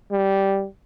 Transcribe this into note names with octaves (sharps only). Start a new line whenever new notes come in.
G3